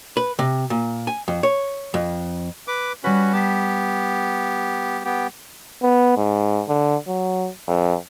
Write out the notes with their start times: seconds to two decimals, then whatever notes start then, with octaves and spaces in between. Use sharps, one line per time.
0.17 B4
0.39 C3
0.70 A#2
1.07 G#5
1.28 F2
1.43 C#5
1.94 F2
2.68 B4 D6
3.04 G3 C#4 F#4 B4
3.33 B3 G4 A5 B6
5.05 B3 G4
5.83 B3
6.17 G#2
6.68 D3
7.08 F#3
7.68 F2